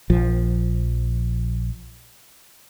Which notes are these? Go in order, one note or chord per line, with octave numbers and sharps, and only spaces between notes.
A#1 F3